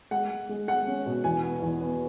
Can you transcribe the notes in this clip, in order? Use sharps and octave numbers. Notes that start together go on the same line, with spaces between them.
G#3 F#5
G#3
G#3
G#3 F#5
C#4
B2
E2 G#5
B3
E2
B3